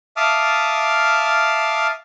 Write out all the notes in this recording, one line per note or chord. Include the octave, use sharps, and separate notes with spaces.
E5 F5 A5 D6 D#6 F6